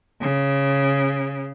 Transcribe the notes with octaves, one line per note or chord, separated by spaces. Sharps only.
C#3